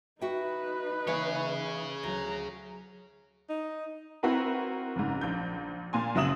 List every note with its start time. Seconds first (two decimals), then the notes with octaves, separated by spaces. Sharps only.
0.21 D#4 F#4 B4 E5 G5
1.07 E3 A#3 G#4 C#5 E5
2.03 D2 F#3 A#5
3.50 D#4
4.23 C4 E4 F#4 A#4 B4
4.96 F#1 G#2
5.21 A#1 G6
5.93 A#2 G#5 C6
6.15 F#1 F#3 E5 D#6 E7 F#7